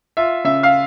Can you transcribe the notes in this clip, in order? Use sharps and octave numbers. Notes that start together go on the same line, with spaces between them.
F4 E5
C#3 E5
F5